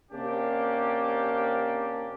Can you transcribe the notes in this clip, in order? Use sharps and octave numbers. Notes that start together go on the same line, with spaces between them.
C3 A#3 C#4 D4 G4